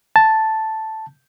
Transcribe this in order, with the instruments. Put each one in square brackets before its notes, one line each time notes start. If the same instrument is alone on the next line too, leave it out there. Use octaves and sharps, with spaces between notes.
[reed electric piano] A5